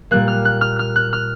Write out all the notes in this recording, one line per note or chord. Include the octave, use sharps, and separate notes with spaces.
A#2 G3 A#3 F#6
F6
F#6
F6
F6
F#6
F6